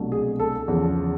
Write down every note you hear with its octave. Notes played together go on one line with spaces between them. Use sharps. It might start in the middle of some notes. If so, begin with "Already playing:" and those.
Already playing: C2 B2 F#3 A3 D4
G#4
A4
E2 C#3 F3